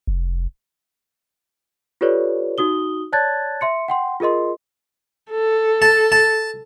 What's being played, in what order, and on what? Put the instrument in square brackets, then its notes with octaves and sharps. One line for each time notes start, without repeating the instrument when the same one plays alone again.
[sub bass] F1
[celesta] F4 G4 A4 B4 C#5 D5
D#4 F#4 D#6 G7
C#5 D5 A5 F#6 G#6 A6
E5 C6 C#7
F#5 G5 C6
F4 G#4 A#4 D#5 C6
[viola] A4
[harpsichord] A5
A5